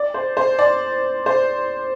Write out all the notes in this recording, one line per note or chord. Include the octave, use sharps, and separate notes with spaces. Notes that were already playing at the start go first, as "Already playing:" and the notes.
Already playing: D5
C5
C5
D5
C5